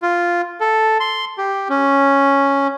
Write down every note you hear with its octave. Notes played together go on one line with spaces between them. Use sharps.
F4
A4
C6
G4
C#4